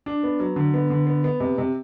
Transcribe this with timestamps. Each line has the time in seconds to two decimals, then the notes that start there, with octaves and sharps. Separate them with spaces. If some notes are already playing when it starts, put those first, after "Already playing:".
0.06 D4
0.23 B3
0.40 F#3
0.56 D3
0.74 B3
0.90 D3
1.07 B3
1.24 B3
1.40 C3
1.58 C3